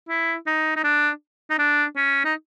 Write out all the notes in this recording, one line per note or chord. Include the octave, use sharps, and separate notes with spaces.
E4
D#4
D#4
D4
D#4
D4
C#4
D#4